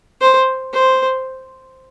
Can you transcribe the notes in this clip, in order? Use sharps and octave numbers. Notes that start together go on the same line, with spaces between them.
C5
C5